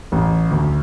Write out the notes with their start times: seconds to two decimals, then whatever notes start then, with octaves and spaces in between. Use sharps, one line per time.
0.12 A1
0.51 D2